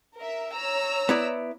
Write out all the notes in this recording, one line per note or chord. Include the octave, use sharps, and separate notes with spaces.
A#4 E5
C#5 A#5 E6
B3 E4 D5